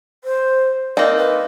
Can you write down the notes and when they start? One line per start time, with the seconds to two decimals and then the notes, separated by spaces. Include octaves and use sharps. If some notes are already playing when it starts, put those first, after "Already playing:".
0.24 C5
0.97 A#3 C4 D#4 D5
1.16 B4